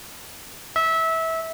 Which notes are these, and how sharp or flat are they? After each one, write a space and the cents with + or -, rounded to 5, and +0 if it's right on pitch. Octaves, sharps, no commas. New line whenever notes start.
E5 -20